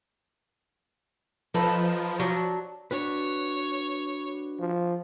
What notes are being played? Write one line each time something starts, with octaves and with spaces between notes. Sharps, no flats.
F3 D#4 A4 B4
F#3 D4
D4 F#4 B4 C#5
F3